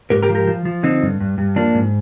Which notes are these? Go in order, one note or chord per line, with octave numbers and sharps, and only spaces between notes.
G#2 G4 A#4
G4 A#4
F3
G4 A#4
F3
F3
D3 C4 D#4
G2
G2
G2
F3 A#3 D4
G#2